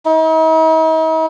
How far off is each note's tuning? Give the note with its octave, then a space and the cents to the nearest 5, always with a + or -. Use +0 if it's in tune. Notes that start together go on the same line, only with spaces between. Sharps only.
D#4 +45